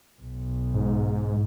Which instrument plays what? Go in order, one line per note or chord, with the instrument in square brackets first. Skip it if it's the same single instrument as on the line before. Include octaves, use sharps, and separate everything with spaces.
[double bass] B1
[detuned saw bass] G#2